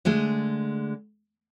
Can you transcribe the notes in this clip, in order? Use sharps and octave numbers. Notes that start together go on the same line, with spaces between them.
D3 G#3 A3 G#4